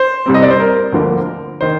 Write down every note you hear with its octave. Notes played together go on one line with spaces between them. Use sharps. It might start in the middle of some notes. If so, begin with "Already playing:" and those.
Already playing: C5
C2 C3 G3 C4
D#5
D5
C5
A#4
D2 D3 F3 A#3
D#3 C5